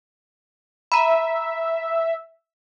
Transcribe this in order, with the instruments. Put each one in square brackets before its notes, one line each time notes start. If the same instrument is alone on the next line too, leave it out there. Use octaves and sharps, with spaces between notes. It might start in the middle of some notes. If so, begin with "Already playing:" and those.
[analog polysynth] E5 [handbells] A#5 B5